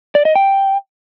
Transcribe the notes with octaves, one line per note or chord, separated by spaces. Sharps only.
D5
D#5
G5